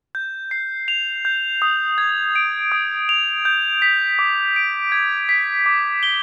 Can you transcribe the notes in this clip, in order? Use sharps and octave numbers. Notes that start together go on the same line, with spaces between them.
G6
C7
F7
G6
D#6
G#6
D7
D#6
F7
G6
B6
D6
D7
G#6
B6
D6
G7